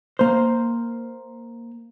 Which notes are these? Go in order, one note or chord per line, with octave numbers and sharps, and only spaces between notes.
A#3 C5